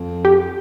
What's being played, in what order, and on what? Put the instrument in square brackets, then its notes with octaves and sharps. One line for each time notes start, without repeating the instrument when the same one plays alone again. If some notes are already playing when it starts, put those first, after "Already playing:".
Already playing: [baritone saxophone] F2
[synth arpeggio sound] G4